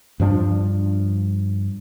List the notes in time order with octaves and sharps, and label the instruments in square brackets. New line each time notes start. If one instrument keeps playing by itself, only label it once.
[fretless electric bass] G2 F3 D4